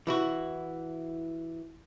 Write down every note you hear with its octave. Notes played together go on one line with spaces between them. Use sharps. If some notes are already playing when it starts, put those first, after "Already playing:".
E3 E4 F#4